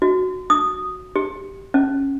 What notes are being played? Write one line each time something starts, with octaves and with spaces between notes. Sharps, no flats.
F#4
D#6
G4
C#4